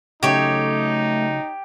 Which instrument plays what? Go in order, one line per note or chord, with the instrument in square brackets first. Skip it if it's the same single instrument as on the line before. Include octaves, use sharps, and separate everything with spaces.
[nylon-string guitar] C#3 F#3 [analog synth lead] A3 [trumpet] D#4 [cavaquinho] G4 C#5